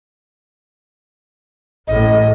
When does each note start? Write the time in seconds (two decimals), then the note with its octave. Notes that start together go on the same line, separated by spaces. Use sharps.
1.88 A1 A2 D#5